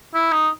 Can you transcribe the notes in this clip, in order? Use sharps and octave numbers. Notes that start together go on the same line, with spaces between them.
E4
D#4